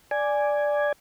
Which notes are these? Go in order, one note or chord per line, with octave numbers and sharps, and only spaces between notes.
D5 G#5